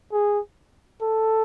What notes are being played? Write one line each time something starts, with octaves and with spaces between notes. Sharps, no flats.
G#4
A4